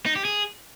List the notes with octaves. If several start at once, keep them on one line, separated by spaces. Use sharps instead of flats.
D#4
G4
G#4